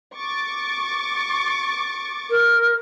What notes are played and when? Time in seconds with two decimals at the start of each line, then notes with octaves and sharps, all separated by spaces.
0.15 C#6 D6 A6
2.30 A#4